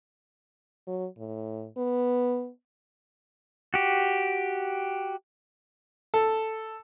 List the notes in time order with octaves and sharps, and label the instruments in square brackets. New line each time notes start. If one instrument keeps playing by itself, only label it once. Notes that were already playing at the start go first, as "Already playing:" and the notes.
[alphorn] F#3
A2
B3
[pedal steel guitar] F#4 G4
[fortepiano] A4